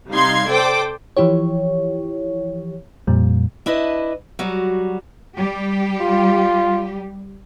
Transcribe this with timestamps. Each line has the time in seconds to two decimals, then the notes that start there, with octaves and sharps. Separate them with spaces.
0.10 C3 G3 D#4 F5 C6 G#6
0.50 A4 C5 D5 G5 D6
1.17 E3 F3 E4 G4 C#5
3.07 F2 A#2 G3
3.66 D4 E4 B4 D#5
4.39 F#3 G3 F#4
5.38 G3 G4
6.01 F4